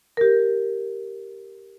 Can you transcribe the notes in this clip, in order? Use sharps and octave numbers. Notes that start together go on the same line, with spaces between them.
G4 A#4